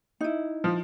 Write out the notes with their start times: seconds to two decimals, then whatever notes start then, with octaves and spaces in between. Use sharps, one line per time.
0.21 D#4 E4
0.64 F3